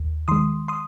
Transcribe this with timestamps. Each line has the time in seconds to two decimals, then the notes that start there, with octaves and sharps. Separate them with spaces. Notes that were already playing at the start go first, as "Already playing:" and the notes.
Already playing: D#2
0.28 D#3 G#3 C6 D#6
0.68 C6 D#6